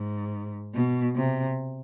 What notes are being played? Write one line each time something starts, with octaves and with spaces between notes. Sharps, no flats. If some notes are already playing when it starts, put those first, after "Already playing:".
Already playing: G#2
B2
C3